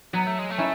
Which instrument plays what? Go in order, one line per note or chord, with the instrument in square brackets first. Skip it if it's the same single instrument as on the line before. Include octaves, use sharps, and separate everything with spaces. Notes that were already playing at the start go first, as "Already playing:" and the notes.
[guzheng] F#3 [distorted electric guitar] B3
[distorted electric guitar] A3
G#3
A3
[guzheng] C#4 E4